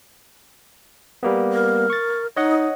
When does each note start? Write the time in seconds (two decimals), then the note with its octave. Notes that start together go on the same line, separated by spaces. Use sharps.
1.23 G3 A#3 B3
1.53 A#4
1.90 C#6 A6
2.37 D#4 C#5 D#5 F#5